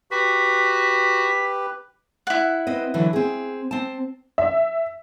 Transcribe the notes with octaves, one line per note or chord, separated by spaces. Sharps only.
F#4 G4 B4 B6
E4 F#5
C4 B4 D#5
D3 E3 F#3
C4 G#4
C4 A5
E5